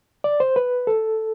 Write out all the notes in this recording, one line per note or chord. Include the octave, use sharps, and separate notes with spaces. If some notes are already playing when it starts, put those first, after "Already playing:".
D5
C5
B4
A4